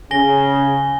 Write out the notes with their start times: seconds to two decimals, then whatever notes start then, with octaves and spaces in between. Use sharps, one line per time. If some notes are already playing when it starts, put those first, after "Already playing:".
0.11 C#3 G#5 A#6 G7